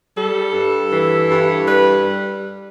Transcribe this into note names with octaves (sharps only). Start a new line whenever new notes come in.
G3 A4
G2
E3
G2
G3 B4